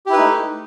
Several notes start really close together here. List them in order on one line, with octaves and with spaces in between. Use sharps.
G4 E4 B4 D#4 A3